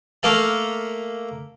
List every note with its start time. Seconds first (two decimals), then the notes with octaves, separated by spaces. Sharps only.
0.23 A3 A#3 A4 F5 A5